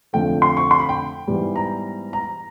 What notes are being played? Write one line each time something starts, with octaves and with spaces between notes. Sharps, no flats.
F2 D3 F3 A3 G5
C6
C#6
C6
B5
G5
G#2 E3 G3 B3
A#5
A#5